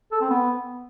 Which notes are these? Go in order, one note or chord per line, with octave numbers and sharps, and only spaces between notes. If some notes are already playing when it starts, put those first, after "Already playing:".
A4
C4
B3